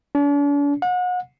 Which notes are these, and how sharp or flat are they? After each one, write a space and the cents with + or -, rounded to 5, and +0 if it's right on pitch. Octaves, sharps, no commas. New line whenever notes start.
D4 -45
F#5 -35